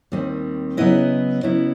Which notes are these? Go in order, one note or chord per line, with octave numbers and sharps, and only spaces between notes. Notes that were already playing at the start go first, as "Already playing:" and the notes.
D#2 D#3 G3 C4
C#3 F#3 B3 E4 D#5
C#3 F#3 B3 E4